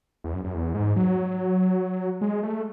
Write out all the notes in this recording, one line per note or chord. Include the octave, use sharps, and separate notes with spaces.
E2
F#2
F#2
E2
G#2
F#3
G#3
A3